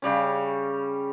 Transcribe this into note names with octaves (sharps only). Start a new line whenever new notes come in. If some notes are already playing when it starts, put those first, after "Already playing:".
C#3 G3 C#4